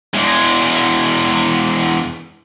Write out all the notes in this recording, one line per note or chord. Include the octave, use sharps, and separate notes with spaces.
E2 G#3